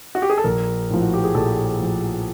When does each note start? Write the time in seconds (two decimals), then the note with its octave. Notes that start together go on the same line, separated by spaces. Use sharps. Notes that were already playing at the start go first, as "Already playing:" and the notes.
0.15 F#4
0.22 G4
0.29 G#4
0.38 A4
0.44 A#1 A#4
0.90 A2 F3
1.02 F#4
1.13 G4
1.24 G#4
1.34 A#1 A4
1.81 A2 F3